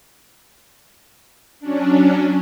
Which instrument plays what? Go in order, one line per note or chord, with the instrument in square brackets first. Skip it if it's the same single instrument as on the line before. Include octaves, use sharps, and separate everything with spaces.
[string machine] F#3 C#4 D4